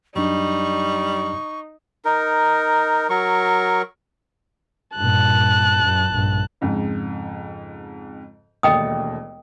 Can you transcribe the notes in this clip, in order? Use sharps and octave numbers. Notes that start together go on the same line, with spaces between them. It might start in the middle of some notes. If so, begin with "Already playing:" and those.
F#2 F#3 G3 D4 D#4 C#6
D#4 A#4
F#3 A#4 C#6
G2 A#2 A5 F#6
F#2
A#1 G2
F2 G#2 C#3
E1 D#2 A3 D#5 G5 D#6